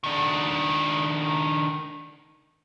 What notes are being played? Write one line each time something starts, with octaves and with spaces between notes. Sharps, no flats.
D#3 D4